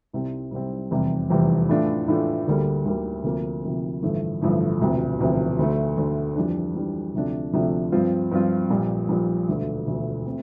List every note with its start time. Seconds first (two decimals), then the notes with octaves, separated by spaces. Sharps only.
0.13 C2 C3 G3 C4
0.51 C2 C3 G3 C4
0.91 F1 E2 C3 G3 C4
1.30 F1 E2 C3 G3 C4
1.69 A2 E3 A3 D4 F4
2.08 A2 E3 A3 D4 F4
2.47 D2 D3 G3 A#3
2.85 D2 D3 G3 A#3
3.24 D2 C3 F3 A#3
3.64 D2 C3 F3 A#3
4.02 A1 G2 D3 F3 A3
4.41 A1 G2 D3 F3 A3
4.81 E1 D2 C3 F3
5.19 E1 D2 C3 F3
5.59 D2 D3 A3
5.97 D2 D3 A3
6.36 F2 E3 G3 D4
6.75 F2 E3 G3 D4
7.14 D2 C3 F3 A3 D4
7.53 D2 C3 F3 A3 D4
7.92 G2 F3 C4 F4
8.31 G2 F3 C4 F4
8.70 A#1 A#2 G3
9.09 A#1 A#2 G3
9.48 E1 D2 D3 A3
9.87 E1 D2 D3 A3
10.26 A3 C4